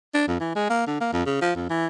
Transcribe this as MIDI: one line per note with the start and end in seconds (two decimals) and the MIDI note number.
0.14 0.25 62
0.28 0.37 41
0.40 0.51 52
0.56 0.65 56
0.70 0.85 58
0.87 1.00 50
1.01 1.09 58
1.13 1.22 41
1.26 1.37 49
1.42 1.52 53
1.55 1.70 41
1.70 1.87 52